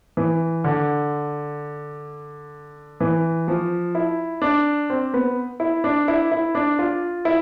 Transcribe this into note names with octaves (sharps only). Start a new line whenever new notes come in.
E3
D3
E3
F3
E4
D4
C4
B3
E4
D4
E4
E4
D4
F4
E4